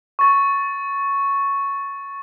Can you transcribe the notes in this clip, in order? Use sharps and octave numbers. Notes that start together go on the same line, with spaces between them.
C#6 A6